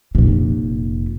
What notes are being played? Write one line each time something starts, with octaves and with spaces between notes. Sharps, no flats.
F1 A#2